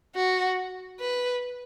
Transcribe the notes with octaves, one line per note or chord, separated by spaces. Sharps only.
F#4
B4